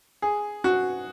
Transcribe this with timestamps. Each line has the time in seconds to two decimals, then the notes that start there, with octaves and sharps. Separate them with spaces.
0.22 G#4
0.64 F#4